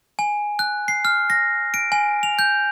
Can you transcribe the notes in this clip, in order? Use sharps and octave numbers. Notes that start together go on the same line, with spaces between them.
G#5
F#6
C7
F6
A#6
D7
G#5
F7
G6